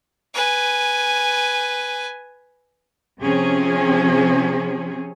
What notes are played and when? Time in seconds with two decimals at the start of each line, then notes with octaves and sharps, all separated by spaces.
0.34 B4 G#5
3.21 C3 F3 C4 C#4 G#4